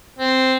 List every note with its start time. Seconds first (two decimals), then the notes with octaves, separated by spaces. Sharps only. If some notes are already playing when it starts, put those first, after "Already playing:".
0.19 C4